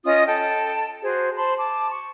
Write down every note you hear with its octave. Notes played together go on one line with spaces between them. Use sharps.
C#4 F4 D#5 D#6
A4 G5 A5
F#4 G#4 C5
C5 A5 B5 C6
A5 D6
C#6